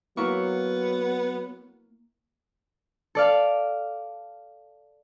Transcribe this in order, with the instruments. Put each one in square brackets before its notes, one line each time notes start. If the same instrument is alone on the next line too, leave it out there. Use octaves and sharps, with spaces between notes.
[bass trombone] F#3 [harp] A#3 E4 C#6 [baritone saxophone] B3
[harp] A4 D5 F5